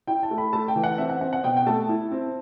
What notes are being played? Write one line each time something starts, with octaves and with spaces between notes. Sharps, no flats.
E4 G5
A5
A3
B5
A3 A5
G5
E3
F#5
C4 E5
F#5
C4 F#5
F#5
B2 G5
G5
A3 A5
E4
C4